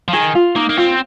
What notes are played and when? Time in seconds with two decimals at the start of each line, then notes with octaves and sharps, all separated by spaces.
0.08 F3
0.13 D#3 G#4
0.35 F4
0.56 A#3 D#4
0.69 A#3
0.77 C4 F4